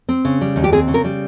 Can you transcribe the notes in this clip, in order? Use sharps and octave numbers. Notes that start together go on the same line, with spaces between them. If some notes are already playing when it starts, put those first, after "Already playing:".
C4
C#3
G3
D#2
G4
C4 G#4
C#3
A#4
G3